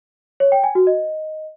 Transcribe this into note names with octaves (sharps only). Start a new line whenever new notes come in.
C#5
G5
G#5
F#4
D#5